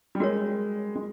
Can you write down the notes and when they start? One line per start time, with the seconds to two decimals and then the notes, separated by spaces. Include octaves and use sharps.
0.15 G3
0.20 G#3 F#4 A#4 C#5
0.96 G#3